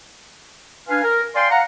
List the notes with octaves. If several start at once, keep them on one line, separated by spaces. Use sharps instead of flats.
D4 B4 F5 G#5
A#4
D5 F5 G5 G#5 C6
F5 F#5 A#5